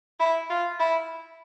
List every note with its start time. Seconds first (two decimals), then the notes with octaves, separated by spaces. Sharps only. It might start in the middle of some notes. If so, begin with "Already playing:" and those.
0.19 E4
0.50 F4
0.79 E4